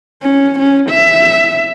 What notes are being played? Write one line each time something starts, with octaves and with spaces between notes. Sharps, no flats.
C#4
C#4
E5